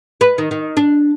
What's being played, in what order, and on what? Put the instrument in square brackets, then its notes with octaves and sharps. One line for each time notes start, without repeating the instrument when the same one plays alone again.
[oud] B4
D#3
D#3
D4